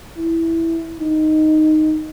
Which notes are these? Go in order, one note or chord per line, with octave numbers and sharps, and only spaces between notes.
E4
D#4